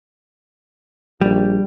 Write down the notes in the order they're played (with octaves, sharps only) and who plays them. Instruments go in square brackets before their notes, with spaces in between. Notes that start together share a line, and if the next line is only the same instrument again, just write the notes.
[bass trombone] A#1 [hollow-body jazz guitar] G3